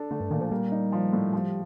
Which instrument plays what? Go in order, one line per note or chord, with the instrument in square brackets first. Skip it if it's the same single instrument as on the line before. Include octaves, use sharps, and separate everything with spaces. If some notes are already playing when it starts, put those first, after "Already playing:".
Already playing: [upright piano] D4 A4
[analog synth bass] D3 [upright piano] A3
[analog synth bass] G2
[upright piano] A#2 [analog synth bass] D#3
[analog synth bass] F3
[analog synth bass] G3 [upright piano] A#3
[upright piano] D#4
F3
A2
F3